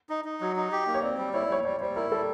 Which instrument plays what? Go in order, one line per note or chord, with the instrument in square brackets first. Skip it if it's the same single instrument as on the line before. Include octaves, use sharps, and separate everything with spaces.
[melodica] D#4
D#4
F#3
D#4
G4
A#3
[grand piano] C#5
[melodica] C4 [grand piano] D5
[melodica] G3
[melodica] E4 [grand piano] C#5
[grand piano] D5
[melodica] G3 [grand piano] C#5
[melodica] G3 [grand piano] C#5
[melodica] G3 [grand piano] C5
[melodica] E4 [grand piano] A#4
[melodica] G3 [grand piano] A4